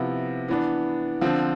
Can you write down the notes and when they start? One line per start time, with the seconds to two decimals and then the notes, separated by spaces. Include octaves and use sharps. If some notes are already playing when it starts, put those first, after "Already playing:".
Already playing: C3 F3 B3 E4
0.48 E3 B3 D4
1.21 D3 F3 C4